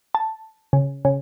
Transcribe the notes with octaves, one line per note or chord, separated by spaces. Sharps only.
A5
C#3
C#3